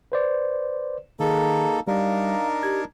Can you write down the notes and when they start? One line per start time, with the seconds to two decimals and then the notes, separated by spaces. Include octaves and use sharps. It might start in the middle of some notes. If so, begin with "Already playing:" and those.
0.12 B4 C5 D5
1.20 D#3 A#3 D#4 G#4 A4
1.87 G3 D4 D#4 A#4 F5
2.63 G4 G#6